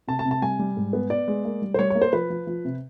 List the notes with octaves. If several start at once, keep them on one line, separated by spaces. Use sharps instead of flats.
C3 A5
A5
C3
A5
G3 G#5
G3
G#2
B3
B3 D5
G#3
A#3
G3
C5
G3 C#5
A#3 C#5
C5
F3 B4
F3
F3
C3